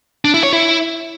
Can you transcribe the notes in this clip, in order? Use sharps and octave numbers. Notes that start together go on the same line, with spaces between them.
D4
E4
C#5
E4